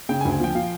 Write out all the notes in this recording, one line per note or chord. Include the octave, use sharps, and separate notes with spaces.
C#3 G5
G#5
D2
G#5
F3 G5
F3 F5